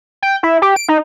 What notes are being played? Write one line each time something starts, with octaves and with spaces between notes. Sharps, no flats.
G5
E4
G4
D7
D#4